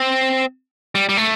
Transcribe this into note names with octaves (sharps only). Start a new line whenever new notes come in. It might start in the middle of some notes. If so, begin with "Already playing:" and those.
Already playing: C4
G3
G3
A3